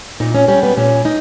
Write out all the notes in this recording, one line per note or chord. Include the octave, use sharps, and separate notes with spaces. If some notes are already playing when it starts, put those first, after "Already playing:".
A#2 D#4
C#4
G3 C#4
B3
A#2 C#4
D#4